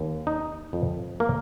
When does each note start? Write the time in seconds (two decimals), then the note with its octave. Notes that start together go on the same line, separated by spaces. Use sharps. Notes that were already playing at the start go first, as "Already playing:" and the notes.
Already playing: D#2
0.27 D#4
0.73 F2
1.20 A#3